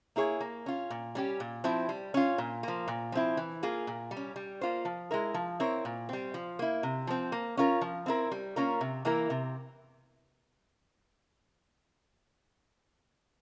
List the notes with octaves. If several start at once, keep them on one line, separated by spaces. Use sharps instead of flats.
A#3 E4 G#4 C#5
A#3
C#4 F4
A#2
G3 C#4 G4
A#2
F3 C4 E4
G3
C#4 F4
A#2
F3 A#3
A#2
F3 C4 E4
E3
A#3 F4 G#4
A#2
G3
C#4
G3
A#3 F4 C5
F3
G#3 E4 A#4
F3
C4 E4 A#4 C#5
A#2
G3 C4
F3
A#3 E4
C3
F3 C4
A#3
C#4 F4 A#4
F3
C4 E4 A#4
G3
A#3 C#4 F4 A#4
C3
E3 A#3 E4 A#4
C3